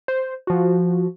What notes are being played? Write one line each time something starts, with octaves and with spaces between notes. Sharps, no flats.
C5
F3 F#4